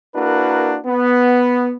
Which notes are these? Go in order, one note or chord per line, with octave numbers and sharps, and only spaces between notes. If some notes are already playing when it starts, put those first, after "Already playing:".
A#3 D4 E4 F#4 A#4 B4
B3